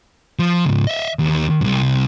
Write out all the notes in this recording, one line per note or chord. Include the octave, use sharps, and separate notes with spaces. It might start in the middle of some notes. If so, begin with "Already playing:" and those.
F3
G#2 C#3
D#5 E5
D#2
C2 F#2